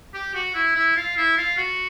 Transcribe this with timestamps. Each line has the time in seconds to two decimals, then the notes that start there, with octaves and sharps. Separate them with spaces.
0.14 G4
0.34 F#4
0.54 E4
0.76 E4
0.96 F4
1.17 E4
1.38 F4
1.57 F#4